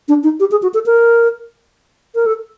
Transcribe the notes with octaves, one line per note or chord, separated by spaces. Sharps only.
D4
D#4
G4
G#4
F#4
A4
A#4
A#4
A4